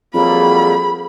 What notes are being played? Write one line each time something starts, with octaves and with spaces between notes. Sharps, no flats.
F2 F#3 G3 A#3 G#4 B5